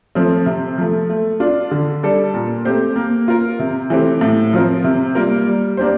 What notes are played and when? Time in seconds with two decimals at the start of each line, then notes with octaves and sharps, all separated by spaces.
0.15 F3 A3 C4
0.46 C3
0.78 F3 A3
1.09 A3
1.40 D4 F4
1.71 D3
2.03 G3 D4 A4
2.34 A#2
2.65 A3 C4 G4 C5
2.96 A#3
3.28 F4 A#4
3.59 C3
3.90 E3 A3 C4 G4
4.21 A2
4.53 F3 C4 F4 A#4
4.84 C3
5.15 G3 A#3 F4 A#4
5.46 G3
5.77 A#3 D4 G4 C5